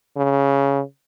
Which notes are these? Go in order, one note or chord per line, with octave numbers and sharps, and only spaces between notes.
C#3